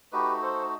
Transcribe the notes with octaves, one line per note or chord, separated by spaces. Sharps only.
A3 D#4 F#4 G4 B4
A4 C5